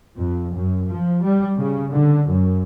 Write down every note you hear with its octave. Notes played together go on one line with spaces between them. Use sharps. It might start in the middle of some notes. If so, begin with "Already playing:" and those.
F2
F#2
F3
G3
C#3
D3
F#2